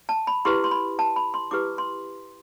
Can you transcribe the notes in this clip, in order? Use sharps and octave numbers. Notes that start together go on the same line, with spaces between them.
A5
B5
E4 G4 B4 C6
C6
B5
A5
B5
C6
E4 G4 B4 D6
C6